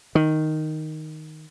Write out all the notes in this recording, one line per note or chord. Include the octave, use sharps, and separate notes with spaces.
D#3